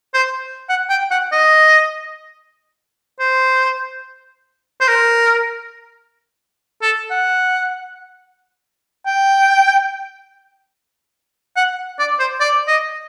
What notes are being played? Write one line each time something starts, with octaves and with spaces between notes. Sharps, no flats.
C5
F#5
G5
F#5
D#5
C5
C5
A#4
A4
F#5
G5
F#5
D5
C5
D5
D#5